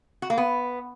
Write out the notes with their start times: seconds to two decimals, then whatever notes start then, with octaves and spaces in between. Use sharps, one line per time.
0.22 F#4
0.30 A#3
0.38 B3